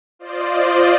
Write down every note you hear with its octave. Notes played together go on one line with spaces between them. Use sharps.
F4 C5 D5 D#5